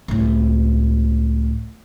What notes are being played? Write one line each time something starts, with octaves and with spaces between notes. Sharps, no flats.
C#2 A2